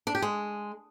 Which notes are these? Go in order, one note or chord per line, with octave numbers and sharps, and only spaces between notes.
D4
G4
G#3